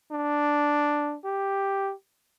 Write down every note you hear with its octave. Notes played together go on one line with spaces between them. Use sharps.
D4
G4